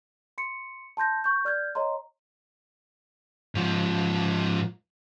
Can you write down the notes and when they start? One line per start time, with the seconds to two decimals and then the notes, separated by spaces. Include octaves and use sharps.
0.38 C6 C#7
0.97 A5 C6 G6 A#6
1.24 C#6 G6
1.45 D5 F6 G6 G#6
1.75 C#5 D#5 A#5 C6
3.55 G#2 F3